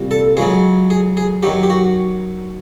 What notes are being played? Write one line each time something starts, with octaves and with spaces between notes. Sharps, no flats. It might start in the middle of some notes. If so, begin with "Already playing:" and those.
Already playing: C2 A#2 G3
A4
C#2 C#3 F#3 G#4
G#4
G#4
F#2 D#3 F#3 G4
G4
F#4